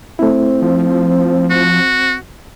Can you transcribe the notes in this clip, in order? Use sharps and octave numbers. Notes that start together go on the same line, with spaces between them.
A3 C4 E4
F3
F#4